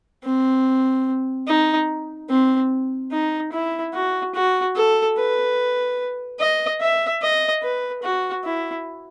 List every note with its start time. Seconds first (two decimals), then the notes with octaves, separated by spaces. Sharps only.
0.24 C4
1.47 D#4
2.30 C4
3.12 D#4
3.52 E4
3.94 F#4
4.35 F#4
4.76 A4
5.17 B4
6.40 D#5
6.81 E5
7.22 D#5
7.63 B4
8.03 F#4
8.45 E4